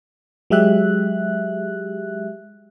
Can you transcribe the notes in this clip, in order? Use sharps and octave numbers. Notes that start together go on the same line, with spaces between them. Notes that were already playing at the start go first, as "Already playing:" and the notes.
F#3 G#3 G4 E5 F#6